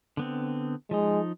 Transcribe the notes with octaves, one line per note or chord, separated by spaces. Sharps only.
D3 B3 C4
F3 G#3 D#4